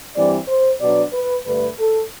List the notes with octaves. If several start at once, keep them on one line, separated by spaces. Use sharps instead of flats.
G2 E3 G3 C4 D5
C5
B2 F#3 B3 D4 D5
B4
G2 D3 A3 B4
A4